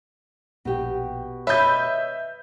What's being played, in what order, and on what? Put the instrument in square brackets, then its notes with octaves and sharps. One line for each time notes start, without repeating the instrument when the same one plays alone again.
[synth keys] A#1 G5 [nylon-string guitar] B2 G4
[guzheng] B4 D#5 [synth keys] C#5 [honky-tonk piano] E5 G6